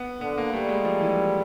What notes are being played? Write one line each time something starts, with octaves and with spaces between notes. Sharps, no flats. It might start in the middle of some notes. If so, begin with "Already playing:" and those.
Already playing: B3
D3 B3
A#3
G3 A3
G#3
F3
E3